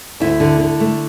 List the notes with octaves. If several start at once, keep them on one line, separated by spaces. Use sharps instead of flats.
D2 E4
D3
D3
A3